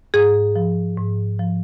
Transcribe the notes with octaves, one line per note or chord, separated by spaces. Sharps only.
G#2 G#4
F3
G#2
F3